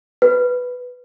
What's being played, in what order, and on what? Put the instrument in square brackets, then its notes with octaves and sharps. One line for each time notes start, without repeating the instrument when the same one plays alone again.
[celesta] B4